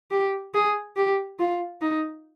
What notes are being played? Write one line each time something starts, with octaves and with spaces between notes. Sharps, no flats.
G4
G#4
G4
F4
D#4